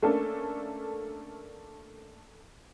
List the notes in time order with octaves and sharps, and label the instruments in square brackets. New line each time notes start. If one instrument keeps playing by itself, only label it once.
[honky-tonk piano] A3 A#3 C#4 D4 A4